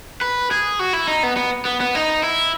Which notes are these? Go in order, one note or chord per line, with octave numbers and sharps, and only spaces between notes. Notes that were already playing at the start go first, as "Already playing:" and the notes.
B4
G#4
F#4
E4
D#4
B3
B3
B3
B3
D#4
E4